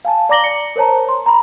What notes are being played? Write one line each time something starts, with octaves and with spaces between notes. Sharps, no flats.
F5 G#5 A5
D5 A#5 D6 A#6 F#7 G7
C#7
A#4 C5 C#5 A5 A#5
C6
A#5 B5